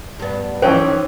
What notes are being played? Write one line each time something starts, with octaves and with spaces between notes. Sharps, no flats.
G2 B3
E3 F3 C#4 D#4 C5 G5